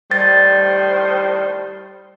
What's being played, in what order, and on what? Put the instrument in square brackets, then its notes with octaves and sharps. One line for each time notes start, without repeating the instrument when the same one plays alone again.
[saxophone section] A2 D#3 C5 [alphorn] G3 [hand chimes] A6